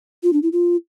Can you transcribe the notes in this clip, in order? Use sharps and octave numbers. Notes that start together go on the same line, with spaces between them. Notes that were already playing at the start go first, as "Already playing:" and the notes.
F4
D4
E4
F4